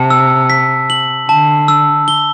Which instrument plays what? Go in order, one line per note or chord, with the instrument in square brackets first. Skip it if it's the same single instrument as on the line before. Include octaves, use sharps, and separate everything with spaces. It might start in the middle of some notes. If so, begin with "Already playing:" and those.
Already playing: [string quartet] C3 [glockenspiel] A5
[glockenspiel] E6
B6
F#7
[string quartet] D3 [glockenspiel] A5
[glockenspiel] E6
G7